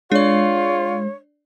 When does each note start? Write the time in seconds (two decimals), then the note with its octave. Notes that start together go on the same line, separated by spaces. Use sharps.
0.12 G#3 D4 F4 C#5 D5